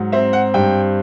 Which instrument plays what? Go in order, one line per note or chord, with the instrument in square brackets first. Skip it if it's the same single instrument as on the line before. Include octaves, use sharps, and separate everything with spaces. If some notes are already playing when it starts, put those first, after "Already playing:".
Already playing: [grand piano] G#2 F#3
C4 E5
F#5
G2 G5